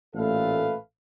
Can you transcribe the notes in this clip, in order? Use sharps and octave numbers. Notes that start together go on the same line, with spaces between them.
A1 A#2 A3 A4 B4 F5